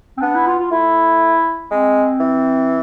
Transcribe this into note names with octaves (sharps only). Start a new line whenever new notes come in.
C4
B3 D4
E4
F4
F4
A3 E4
G#3 C4
E3